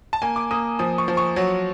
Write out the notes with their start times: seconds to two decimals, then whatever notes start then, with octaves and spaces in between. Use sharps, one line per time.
0.13 A5
0.22 A#3 G#5
0.36 D6
0.51 A#3 D#6
0.79 F3 D#6
0.98 C#6
1.08 F3
1.17 C#6
1.36 F#3